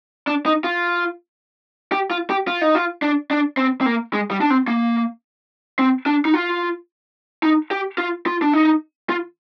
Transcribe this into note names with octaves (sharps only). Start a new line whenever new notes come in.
D4
D#4
F4
G4
F4
G4
F4
D#4
F4
D4
D4
C4
C4
A#3
G#3
G3
D4
C4
A#3
C4
D4
D#4
F4
D#4
G4
F4
F4
D4
D#4
F4